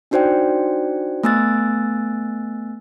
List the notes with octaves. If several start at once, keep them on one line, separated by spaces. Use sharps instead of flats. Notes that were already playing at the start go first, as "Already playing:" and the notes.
D4 D#4 F#4 C5 D5 G5
A3 B3 G#5 E6 F#6 A6